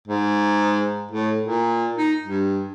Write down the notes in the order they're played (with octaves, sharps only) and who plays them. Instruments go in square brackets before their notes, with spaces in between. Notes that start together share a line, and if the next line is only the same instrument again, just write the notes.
[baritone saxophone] G#2
A2
A#2
D#4
G2